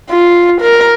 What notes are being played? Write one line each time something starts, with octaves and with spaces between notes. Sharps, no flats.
F4
A#4